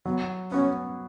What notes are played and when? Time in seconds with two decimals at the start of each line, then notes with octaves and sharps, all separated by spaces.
0.05 F#3 B3
0.52 B3 C#4 F#4